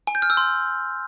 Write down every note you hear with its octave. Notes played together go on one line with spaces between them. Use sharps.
G#5
G6
F6
E6
C6